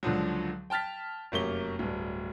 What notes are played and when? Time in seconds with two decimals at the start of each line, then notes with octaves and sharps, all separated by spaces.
0.03 C#2 D3 F3 F#3
0.70 G5 A5 F6 A6 B6
1.32 F1 F#2 A#3 C#6 G7
1.79 D1 G2